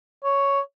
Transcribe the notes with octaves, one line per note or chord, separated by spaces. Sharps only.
C#5